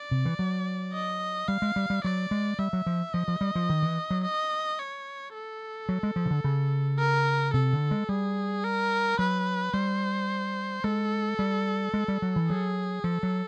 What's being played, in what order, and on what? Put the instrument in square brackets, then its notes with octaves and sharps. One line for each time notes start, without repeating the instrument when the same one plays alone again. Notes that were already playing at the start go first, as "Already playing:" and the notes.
Already playing: [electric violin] D5
[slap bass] C3
E3
F#3
[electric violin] D#5
[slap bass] G3 [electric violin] F5
[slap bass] G#3
G3
G3
[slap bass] F#3 [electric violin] D5
[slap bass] G#3
[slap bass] G3 [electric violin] E5
[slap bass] F#3
F3
[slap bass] F3 [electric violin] D#5
[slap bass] F3
G3
F3
D#3
E3
F#3
[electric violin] D#5
C#5
A4
[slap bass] F#3
G#3
F3
C#3
D3
C#3
[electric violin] A#4
[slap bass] C3 [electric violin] A4
[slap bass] D3
G#3
[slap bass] G3 [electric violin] G#4
[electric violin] A#4
[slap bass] F#3 [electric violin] B4
[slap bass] G3 [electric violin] C5
[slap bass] G#3 [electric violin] A4
[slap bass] G3
G#3
G3
F#3
E3
[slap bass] F#3 [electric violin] G#4
[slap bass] F3 [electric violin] A4
[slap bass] F#3